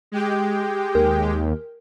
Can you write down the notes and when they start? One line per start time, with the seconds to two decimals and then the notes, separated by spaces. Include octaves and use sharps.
0.12 G#3 G4 G5
0.95 D#2 A#4